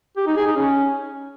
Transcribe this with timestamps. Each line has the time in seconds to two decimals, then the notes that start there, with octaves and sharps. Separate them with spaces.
0.17 G4
0.27 D#4
0.36 G#4
0.46 D#4
0.56 C#4